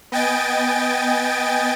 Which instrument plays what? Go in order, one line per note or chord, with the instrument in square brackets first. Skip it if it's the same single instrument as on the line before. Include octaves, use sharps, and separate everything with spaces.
[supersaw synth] B3 D#5 G5 G#5 A6 D7